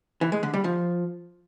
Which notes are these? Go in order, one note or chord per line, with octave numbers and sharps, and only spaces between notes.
E3
G#3
D3
G3
F3